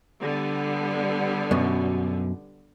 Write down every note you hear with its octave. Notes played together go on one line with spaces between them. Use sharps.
D3 G3 B3
F#2 B2